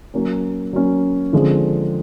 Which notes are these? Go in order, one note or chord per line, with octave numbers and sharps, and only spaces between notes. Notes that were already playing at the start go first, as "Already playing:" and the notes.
F#3 A#3 C#4
F#3 A#3 C#4
D3 F3 G#3 C4